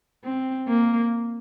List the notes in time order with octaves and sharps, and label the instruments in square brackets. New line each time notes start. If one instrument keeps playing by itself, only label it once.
[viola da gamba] C4
A#3